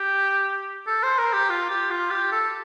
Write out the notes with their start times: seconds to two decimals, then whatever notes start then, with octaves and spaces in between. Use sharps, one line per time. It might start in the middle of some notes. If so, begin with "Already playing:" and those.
Already playing: G4
0.87 A4
1.03 C5
1.18 A#4
1.33 G4
1.50 F4
1.70 G4
1.91 F4
2.11 G4
2.32 A4